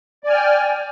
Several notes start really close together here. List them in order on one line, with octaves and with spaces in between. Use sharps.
D5 G#5 F6 G5